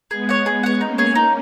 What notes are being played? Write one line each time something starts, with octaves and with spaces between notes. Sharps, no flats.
G#3 B3 G#4
C#5 F#5
G#3 B3 G#4
C#5 F#5
A#3 C#4 D#4
G#4 C#5
D#4